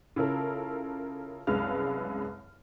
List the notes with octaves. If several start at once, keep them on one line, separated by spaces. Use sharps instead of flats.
C#3 E4 F4 A4 A#4
C2 F#2 G#3 B4 F5 F6